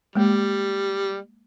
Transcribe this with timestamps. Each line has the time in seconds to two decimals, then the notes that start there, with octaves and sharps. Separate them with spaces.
0.15 G3 G#3 A#3